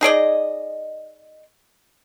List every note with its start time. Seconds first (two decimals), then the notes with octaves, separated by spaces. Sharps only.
0.01 D#4 G#4 D5 D#5